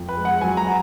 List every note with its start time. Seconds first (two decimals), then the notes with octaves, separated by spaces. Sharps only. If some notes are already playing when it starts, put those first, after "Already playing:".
Already playing: F2
0.09 B4
0.17 G#3
0.25 F#5
0.41 F#3 G#5
0.57 A#5
0.67 F#5